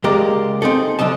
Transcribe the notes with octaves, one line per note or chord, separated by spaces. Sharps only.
C#2 G#3 A#3 G4 D5 A#5
C4 D#4 G#4 A4
D3 F#3 D#5 A5